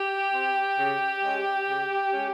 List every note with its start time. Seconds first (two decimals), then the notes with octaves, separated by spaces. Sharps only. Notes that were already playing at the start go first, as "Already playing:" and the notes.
Already playing: G4
0.33 C4
0.78 C#3
1.23 G#3 C#4
1.68 C#3
2.13 G#3 C#4